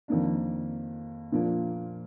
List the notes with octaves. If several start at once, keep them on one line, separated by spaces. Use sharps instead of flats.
F2 D#3 A#3 D4
A#2 F3 A#3 D4